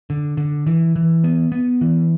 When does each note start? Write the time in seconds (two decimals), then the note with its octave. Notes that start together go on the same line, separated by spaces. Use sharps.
0.10 D3
0.37 D3
0.67 E3
0.96 E3
1.24 B3
1.52 B3
1.81 E3